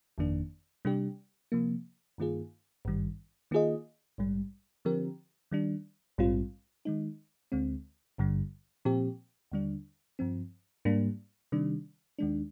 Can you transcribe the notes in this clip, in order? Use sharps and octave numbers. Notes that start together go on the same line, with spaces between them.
G1 F2 D#3 A#3 D4
C3 G3 D4 G4
C3 F3 A#3
G2 D#3 A#3 F4 G#4
G#1 G2 D#3 G3
D#3 A#3 F4 G#4 D#5
A#1 G#2 G3
D3 F3 C4 G4 A#4
D#3 G3 D4
A#1 G#2 G3 C4 F4
D#3 G#3 D#4
D2 D3 G#3 C4
G#1 G2 D3 G3
A#2 F3 C4 G4
D#2 D3 G3 D4
G2 F3 C4
G#2 G3 A#3 D4
C3 D#3 G3 D4
D#2 D#3 G#3 D4